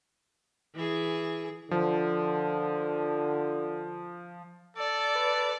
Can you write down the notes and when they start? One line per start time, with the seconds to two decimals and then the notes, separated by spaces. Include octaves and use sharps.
0.75 E3 G#4
1.71 D3 F3
4.77 A4 D5
5.15 B4